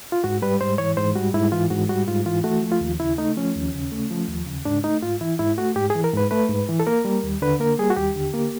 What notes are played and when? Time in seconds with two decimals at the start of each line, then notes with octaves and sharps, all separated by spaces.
0.12 F4
0.24 G#2 F#4
0.42 G3 B4
0.61 G#2 C5
0.78 E3 C#5
0.97 G#2 C5
1.15 G3 F#4
1.34 G#2 E4
1.52 E3 F4
1.70 G#2 F#4
1.89 G3 F#4
2.08 G#2 F4
2.26 E3 F4
2.44 A3 F#4
2.63 F3
2.72 F4
2.81 D#2
3.00 C#3 E4
3.18 A3 D#4
3.37 F3 C#4
3.56 D#2
3.74 C#3
3.92 A3
4.11 F3
4.28 D#2
4.47 C#3
4.65 G#2 D4
4.84 A3 D#4
5.03 G#2 F4
5.21 E3 E4
5.39 G#2 E4
5.58 A3 F#4
5.76 G#2 G4
5.90 G#4
5.95 E3
6.04 A#4
6.13 G#2 B4
6.31 A3 B4
6.49 G#2
6.69 E3
6.80 A4
6.87 A#3 A#4
7.05 G3
7.24 D#2
7.42 D3 B4
7.60 A#3 A#4
7.79 G3 G#4
7.90 F#4
7.97 D#2 G4
8.15 D3
8.34 A#3